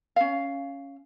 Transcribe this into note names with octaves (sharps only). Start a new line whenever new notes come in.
C#4 F5